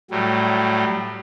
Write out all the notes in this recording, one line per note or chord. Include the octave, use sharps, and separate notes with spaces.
A2 F#3 G3